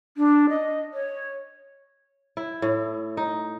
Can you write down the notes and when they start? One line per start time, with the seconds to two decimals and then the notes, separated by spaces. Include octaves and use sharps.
0.17 D4
0.49 D#5
0.93 C#5
2.37 E4
2.62 A2
3.17 D#4